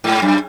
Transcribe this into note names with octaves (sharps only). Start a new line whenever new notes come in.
G#2
F#2